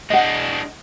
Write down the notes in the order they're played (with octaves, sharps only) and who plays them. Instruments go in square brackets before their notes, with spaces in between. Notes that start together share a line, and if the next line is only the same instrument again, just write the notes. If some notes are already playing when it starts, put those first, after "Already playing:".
[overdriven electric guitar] G#3 D4 [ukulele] D#5 F#5